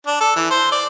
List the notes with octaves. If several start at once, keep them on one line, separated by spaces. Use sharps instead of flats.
D4
A4
E3
C5
D5